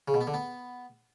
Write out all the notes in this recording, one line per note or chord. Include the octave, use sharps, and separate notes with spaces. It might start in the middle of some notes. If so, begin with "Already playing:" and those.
C#3
B2
B3
D3
B3